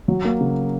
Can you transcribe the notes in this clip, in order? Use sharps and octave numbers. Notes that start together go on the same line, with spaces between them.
F#3
A#3
C#3